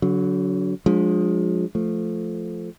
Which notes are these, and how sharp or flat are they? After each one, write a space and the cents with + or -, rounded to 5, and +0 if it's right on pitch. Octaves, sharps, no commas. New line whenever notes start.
D3 -45 F#3 +0
F3 +30 G#3 +0 D4 +0
F3 +0 A3 -5